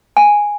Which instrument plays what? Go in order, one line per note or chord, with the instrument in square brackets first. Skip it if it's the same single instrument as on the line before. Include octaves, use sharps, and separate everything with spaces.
[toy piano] G#5